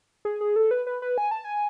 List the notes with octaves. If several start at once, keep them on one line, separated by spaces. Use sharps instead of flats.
G#4
G#4
A4
B4
B4
B4
G#5
A5
G#5